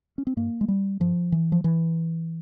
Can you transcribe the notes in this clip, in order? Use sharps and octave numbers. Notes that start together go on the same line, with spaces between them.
C#4
C4
G2 A#3
G#3
G3
G2 F3
E3
F3
E3